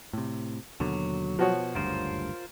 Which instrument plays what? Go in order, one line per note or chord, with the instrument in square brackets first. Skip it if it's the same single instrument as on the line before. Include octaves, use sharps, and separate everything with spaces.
[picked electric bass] A2 C3
[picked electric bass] D#2 B2 D3 [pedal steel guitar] F#3
[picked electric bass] B2 [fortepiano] F3 F#4 C#5
[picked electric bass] F#1 D2 G2 [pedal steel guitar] F4 A#4 C5